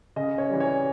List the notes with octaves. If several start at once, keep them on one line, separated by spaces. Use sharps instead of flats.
C#3 D#5
C#5
E3 G3
C#5